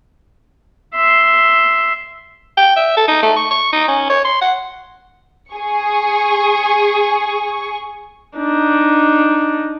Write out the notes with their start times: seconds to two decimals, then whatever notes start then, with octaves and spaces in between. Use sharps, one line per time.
0.94 E5 C6
2.57 G5
2.76 E5
2.97 A4
3.08 D#4
3.23 A3
3.37 C#6
3.51 C#6
3.73 D#4
3.88 C#4
4.10 C#5
4.25 C6
4.41 F#5
5.54 G#4 C#6
8.38 D4 D#4